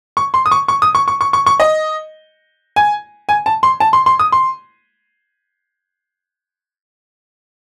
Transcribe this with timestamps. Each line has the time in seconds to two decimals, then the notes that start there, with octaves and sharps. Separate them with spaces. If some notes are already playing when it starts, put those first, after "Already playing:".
0.17 C#6
0.34 C6
0.46 D#6
0.51 C#6
0.68 C#6
0.82 D#6
0.95 C#6
1.08 C#6
1.21 C#6
1.33 C#6
1.46 C#6
1.60 D#5
2.76 G#5
3.29 G#5
3.46 A5
3.63 C6
3.80 A5
3.93 C6
4.06 C6
4.19 D#6
4.32 C6